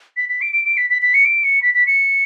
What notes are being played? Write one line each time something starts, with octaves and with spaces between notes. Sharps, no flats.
B6
B6
D7
D7
D7
B6
B6
B6
C#7
D7
C#7
B6
B6
C#7